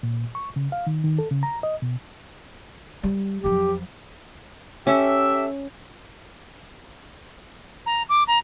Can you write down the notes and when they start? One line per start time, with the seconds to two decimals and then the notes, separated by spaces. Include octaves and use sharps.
0.03 A#2
0.35 C#6
0.56 C#3
0.72 F5
0.87 D#3
1.04 D#3
1.19 A4
1.31 C#3
1.43 A#5
1.63 D#5
1.82 B2
3.03 G3
3.44 F2 F#3 G4
4.87 C#4 G4 A4 E5
7.86 A#5
8.09 D6
8.28 A#5